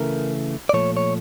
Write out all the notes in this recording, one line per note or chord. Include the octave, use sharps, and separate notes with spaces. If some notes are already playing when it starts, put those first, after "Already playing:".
Already playing: C#3 E3 A3 A#4
D5
A#2 F3 A3 C#5
C#5